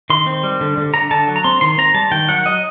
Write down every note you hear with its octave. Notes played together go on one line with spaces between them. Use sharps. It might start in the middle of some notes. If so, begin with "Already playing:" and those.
D#3 C6
C4
G3
D3
D3
D3 A#5
D3 A5
F#3
A#5
C4 C6
D#3 C6
C4 A#5
G3 A5
D#3 G5
F#3 F#5
F#3 D#5